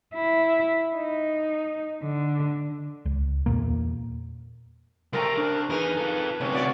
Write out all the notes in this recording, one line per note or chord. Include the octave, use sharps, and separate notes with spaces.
E4
D#4
D3
C#2
E2 G2 A#2 A#3
C#2 G3 A3 C4 A#4 A#5
C3 D4
E2 D#4 G#4 A#4 B4
F4 A4
D2 C3 C#4
C#4 F#4 D5